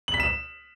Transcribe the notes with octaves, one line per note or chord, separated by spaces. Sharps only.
F#7
B6
E7